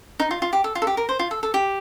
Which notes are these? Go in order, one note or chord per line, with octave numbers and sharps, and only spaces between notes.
D#4
F4
F4
G4
A4
F4
A4
G4
A#4
C5
F4
A4
A4
G4